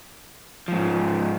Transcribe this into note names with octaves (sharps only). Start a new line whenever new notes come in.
G#2 F3